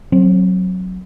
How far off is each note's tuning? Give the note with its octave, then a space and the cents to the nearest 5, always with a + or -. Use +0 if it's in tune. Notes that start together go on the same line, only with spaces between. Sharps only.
F#3 +0 C4 +25